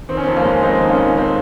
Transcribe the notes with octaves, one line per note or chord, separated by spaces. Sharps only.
D#3 C4
C#4
F2 C4
A#3 C#4
G#3
F2 C4 D#4
D#3
A#3 C#4
F2
G#3 C4